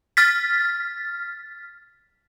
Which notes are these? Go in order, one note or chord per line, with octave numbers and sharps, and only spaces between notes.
F6 A6 B6